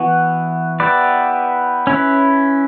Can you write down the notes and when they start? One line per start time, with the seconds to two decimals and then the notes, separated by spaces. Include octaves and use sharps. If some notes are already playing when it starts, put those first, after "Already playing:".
Already playing: E3 B3 F#4
0.80 B3 E4 G4 B4 D5
1.87 C#4 E4 B4